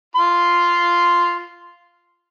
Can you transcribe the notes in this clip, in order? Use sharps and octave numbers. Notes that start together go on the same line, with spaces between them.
F4 C6